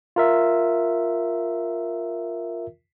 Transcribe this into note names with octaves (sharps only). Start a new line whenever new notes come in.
F4 A#4 E5